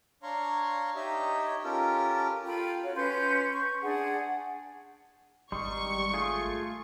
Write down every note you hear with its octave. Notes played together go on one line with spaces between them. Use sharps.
D4 C#5 F5 A#5 C6 C#6
D#4 G4 C#5 D#5 E5
C#4 F4 G4 A4 A#4
F4 A4 G5 B5
F#4 C#5 F5
C#4 B4 C6 G6
C#6
D4 G#4 F#5
G#1 G3 D#4 C6 C#6
A3 F4 G#4